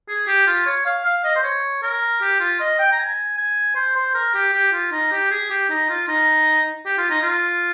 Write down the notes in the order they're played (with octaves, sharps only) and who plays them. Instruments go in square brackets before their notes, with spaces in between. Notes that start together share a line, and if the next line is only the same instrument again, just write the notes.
[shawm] G#4
G4
F4
C#5
F5
F5
D#5
C5
C#5
A#4
G4
F4
D#5
G5
A#5
G#5
G#5
C5
C5
A#4
G4
G4
F4
D#4
G4
G#4
G4
D#4
F4
D#4
G4
F4
D#4
F4